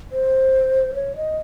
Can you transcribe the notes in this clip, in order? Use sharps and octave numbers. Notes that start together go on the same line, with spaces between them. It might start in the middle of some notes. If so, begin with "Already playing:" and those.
C5
C#5
D#5